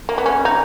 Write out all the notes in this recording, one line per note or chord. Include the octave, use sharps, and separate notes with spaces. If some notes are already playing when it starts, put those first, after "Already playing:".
A#3
B3
C#4
D#4